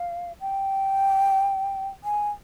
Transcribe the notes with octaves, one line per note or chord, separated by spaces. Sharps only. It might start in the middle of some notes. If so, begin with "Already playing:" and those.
Already playing: F5
G5
G#5